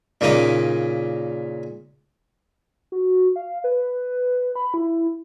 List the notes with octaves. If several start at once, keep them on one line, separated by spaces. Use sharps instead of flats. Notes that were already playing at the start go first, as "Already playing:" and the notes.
A#2 C#3 C#4 D#4
F#4
F5
B4
B5
E4